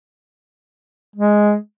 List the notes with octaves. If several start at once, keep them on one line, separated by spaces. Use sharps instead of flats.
G#3